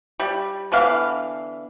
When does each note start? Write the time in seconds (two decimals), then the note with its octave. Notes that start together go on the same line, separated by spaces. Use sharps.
0.20 G3
0.72 D3 E3 B3 F5